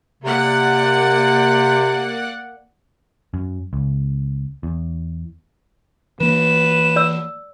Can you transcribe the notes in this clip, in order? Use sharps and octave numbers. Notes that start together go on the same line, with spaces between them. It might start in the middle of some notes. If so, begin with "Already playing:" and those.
C3 A#3 D5 F#5
F#2
C#2
E2
E3 A#3 B4 E7
D5 E6